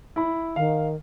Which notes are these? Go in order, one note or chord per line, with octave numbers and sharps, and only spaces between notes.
E4 B5
D#3 F5